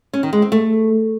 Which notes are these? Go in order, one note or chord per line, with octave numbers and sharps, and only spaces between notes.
C#4
D#3
G#3
C4
A3